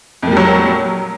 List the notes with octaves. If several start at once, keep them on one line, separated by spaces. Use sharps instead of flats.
F2 A#2 F#3 G3